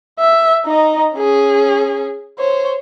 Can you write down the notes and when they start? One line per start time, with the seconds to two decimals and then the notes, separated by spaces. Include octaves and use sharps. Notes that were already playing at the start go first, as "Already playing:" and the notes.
0.19 E5
0.66 D#4 D#5
1.16 C#4 G#4
2.39 C5 C#5